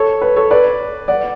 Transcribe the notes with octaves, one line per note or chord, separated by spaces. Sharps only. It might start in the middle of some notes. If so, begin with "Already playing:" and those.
Already playing: A4 C#5
B4
A4 C#5
B4 D5
D5 F#5